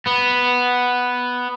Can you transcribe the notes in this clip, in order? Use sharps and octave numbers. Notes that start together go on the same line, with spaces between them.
B3